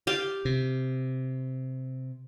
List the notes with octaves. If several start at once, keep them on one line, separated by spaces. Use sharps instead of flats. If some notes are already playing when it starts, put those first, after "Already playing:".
G4 F5
C3